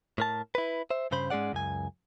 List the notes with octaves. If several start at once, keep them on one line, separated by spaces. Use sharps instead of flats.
A2 A#4 A5
E4 B4
C5 E5
G2 C#3 C5 B5
G#2 G#3 C#4 G#4 D5 F#5
C#2 F#2 G#5